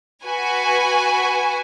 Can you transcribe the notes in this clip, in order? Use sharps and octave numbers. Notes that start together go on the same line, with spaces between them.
F#4 B4 G#5